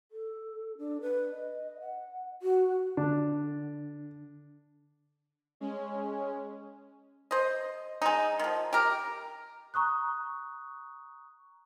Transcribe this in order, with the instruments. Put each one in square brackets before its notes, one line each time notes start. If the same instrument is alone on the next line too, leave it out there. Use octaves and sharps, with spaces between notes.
[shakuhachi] A4
D4
B4
D#5
F#5
F#4
[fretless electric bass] D3 [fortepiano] D4
[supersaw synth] G#3 C#4
[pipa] C5 D#5
G#3 D#4
D#3 F3
G4 A#4
[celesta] A#5 C#6 D#6 F#6